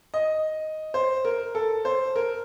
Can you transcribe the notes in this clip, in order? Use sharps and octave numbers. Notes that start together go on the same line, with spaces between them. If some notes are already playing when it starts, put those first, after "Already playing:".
D#5
C5
A#4
A4
C5
A#4